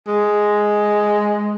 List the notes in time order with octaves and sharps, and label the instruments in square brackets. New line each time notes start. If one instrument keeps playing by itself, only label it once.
[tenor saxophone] G#3